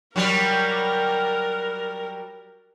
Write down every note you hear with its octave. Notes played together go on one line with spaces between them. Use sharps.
F#3 G3 A#4